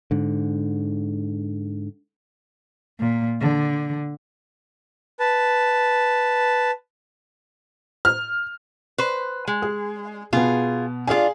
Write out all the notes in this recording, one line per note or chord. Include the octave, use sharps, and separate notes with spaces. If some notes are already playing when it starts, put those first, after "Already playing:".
G#2 D3
A#2
D3
B4 A5
F6
B4 C5
G#3
G#4
B2 B3 F4 G#4
D4 F4 G#4 F5 G#5